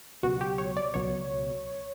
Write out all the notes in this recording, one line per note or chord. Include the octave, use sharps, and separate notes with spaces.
C#2 B2 F#3 F#4
G4
C#5
D5
C#2 B2 F#3 C#5